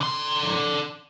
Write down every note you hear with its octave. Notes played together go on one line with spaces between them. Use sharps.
D3 C6